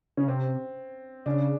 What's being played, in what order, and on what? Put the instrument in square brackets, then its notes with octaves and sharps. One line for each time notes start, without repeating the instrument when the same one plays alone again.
[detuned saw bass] C#3 [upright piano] C#4
[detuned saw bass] C3 [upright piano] C4
[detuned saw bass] C#3 [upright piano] D4